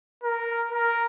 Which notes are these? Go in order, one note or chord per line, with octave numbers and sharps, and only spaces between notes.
A#4
A#4